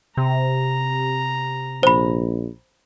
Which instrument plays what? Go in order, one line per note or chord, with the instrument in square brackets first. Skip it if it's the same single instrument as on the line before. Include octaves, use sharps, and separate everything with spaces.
[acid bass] C3 [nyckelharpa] A#5
[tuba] A#1 [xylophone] C5 B5